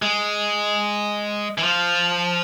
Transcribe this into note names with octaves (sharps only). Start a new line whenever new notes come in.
G#3
E3
F3